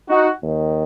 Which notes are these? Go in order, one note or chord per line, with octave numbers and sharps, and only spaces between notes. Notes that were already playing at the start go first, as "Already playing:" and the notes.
D#4 F#4
D#2 D#3